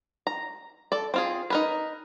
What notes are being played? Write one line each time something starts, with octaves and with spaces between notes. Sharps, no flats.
A#5
A4 D5
C4 F4 G#4
D#4 A#4 B4